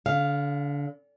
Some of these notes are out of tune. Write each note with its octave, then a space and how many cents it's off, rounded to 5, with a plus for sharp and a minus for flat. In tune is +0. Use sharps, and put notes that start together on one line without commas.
D3 -30 F5 +0